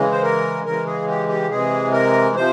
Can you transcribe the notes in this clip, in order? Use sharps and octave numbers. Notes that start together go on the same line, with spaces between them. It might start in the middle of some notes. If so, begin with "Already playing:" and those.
Already playing: C#3 E3 G#3
C5
A#4
C#3 E3 G#3 A#4
G#4
G4
G4
C3 E3 G#3 G#4
A#4
C3 F3 C5